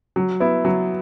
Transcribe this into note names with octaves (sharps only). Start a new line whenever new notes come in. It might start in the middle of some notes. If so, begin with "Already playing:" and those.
F#3
B3 E4
F#3